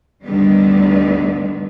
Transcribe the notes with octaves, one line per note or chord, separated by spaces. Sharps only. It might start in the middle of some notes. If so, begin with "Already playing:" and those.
D2 G2 D3 D#3 G3 B3